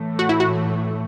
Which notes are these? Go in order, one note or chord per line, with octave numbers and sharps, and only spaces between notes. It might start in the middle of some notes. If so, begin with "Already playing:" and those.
Already playing: A2 E3 A3
F#4
E4
F#4